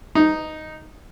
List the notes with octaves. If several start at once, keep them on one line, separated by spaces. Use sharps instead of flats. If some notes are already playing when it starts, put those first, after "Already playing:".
D#4